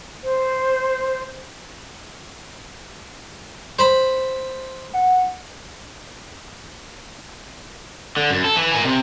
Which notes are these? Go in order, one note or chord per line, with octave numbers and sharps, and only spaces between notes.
C5
C5 B5
F#5
D3
F#2
A4
E3
A#4 G#5
C3